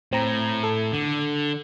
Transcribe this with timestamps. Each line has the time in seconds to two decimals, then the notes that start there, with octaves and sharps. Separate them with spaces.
0.13 A2 C4 A#5
0.63 A4
0.93 D3